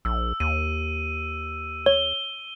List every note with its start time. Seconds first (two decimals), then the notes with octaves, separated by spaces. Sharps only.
0.05 A#1 E6
0.40 D#2 D#7
1.86 C#5 G7